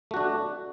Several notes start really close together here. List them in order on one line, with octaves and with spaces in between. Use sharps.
A3 F#4 D4